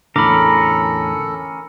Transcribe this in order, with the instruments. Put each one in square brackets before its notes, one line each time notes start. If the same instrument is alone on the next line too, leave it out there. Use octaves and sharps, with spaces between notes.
[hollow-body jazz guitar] E2 A2 D3 [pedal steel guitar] C#4 A#4 [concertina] A4 [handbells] B5 D6